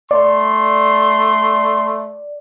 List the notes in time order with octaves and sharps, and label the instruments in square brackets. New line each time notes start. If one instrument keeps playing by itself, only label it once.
[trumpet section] A3 C6 [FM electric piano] D5